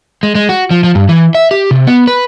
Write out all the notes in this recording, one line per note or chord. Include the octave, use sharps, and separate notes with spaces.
G#3
G#3
F#4
F3
F3
G2
E3
E5
G4
C3
B3
B4